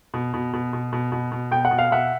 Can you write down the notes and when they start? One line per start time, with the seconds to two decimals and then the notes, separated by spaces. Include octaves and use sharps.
0.14 B2
0.34 B2
0.53 B2
0.73 B2
0.93 B2
1.12 B2
1.32 B2
1.51 B2 G5
1.65 F#5
1.71 B2
1.78 F5
1.91 B2 E5 F#5